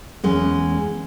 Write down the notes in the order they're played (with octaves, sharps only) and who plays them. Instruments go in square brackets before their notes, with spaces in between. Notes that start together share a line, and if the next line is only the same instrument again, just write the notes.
[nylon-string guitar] E2 G#3 C#4